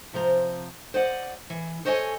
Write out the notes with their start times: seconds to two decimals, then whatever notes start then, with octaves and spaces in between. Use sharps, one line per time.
0.13 C3 F3 C5 A#5
0.94 C5 D5 D#5 F#5
1.50 E3
1.85 A4 C5 C#5 D#5 F#5 G#5